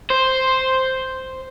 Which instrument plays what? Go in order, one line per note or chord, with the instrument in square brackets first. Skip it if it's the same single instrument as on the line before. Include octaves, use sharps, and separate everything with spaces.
[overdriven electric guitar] C5